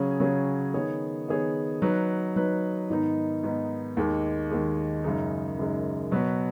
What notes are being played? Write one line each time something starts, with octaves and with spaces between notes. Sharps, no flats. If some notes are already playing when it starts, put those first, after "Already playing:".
Already playing: C#3 F#3 C#4 G#4
C#3 F#3 C#4 G#4
D#3 B3 G#4 C#5
D#3 B3 G#4 C#5
F#3 D#4 B4
F#3 D#4 B4
G#2 D#3 B3 D#4
G#2 D#3 B3 D#4
D#2 D#3 G#3
D#2 D#3 G#3
F#2 C#3 G#3 D#4
F#2 C#3 G#3 D#4
B2 F#3 B3 F#4 B4